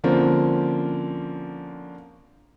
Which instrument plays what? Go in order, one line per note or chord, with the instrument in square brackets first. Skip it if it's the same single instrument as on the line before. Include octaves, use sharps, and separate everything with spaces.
[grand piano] D3 F3 A#3 C4 C#4